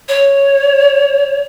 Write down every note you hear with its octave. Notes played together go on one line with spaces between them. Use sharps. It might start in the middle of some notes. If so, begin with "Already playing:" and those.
C#5